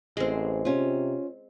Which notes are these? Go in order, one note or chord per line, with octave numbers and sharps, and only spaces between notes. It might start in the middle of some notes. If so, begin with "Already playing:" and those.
A1 G#3 C4
C3 C#4 F4